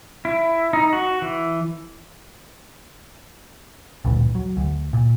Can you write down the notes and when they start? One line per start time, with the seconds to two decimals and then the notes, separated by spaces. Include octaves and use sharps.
0.25 E4
0.73 D#4
0.93 F#4
1.22 E3
4.05 A1 D2 G2 A#2
4.35 F#3
4.57 D2
4.93 A#2